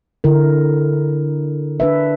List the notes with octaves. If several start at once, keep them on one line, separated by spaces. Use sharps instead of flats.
D3 E4 A#4
D4 B4 E5